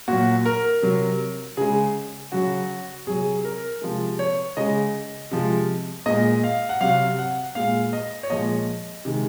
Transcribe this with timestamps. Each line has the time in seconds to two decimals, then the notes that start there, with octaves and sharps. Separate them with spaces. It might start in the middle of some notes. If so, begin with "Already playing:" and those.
0.08 A#2 F#3 F#4
0.46 A#4
0.82 C3 F#3
1.57 C#3 G#3 G#4
2.32 C#3 F#3 F#4
3.07 C3 F#3 G#4
3.45 A#4
3.82 C3 F3 G#3
4.19 C#5
4.57 C#3 G#3 D#5
5.31 C3 F3 G#3
6.06 A#2 G#3 D#5
6.44 F5
6.69 F#5
6.81 C3 F#3 F5
7.18 F#5
7.55 A#2 G#3 F5
7.93 D#5
8.23 C#5
8.30 A#2 F3 G#3 D#5
9.05 C3 D#3 G#3